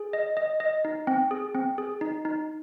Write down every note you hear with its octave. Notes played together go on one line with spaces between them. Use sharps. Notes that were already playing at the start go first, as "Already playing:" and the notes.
Already playing: G#4
D#5
D#5
D#5
D#4
C4
G#4
C4
G#4
D#4
D#4